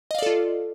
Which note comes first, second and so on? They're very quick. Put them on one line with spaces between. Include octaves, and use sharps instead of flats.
D#5 F5 D5 A4 F4